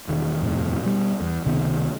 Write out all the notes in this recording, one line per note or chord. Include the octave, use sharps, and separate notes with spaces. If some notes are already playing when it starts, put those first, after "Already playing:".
E1 D#3
D#1 F2 A2 C3
B2 G3
E2
C#2 C3 D#3 B3